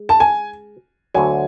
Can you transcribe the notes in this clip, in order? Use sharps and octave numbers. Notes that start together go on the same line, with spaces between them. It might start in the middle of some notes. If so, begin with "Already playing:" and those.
Already playing: G#3
A5
G#5
D2 D3 F#3 G#5